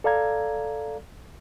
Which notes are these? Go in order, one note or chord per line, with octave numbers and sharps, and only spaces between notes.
A4 D5 F5 A#5 G#6